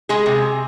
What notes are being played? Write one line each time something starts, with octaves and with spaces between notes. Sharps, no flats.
G#3 G#4
C3